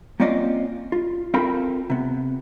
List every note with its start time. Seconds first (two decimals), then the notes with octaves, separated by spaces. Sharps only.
0.20 A#3 C4 C#4 F4 D5 D#5
0.92 F4
1.34 C4 F4 A4 A#4 G5 B5
1.90 C3 B3